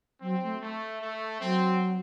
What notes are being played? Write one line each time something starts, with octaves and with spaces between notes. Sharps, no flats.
F#3 C4
A3
A3
A3
F#3 C4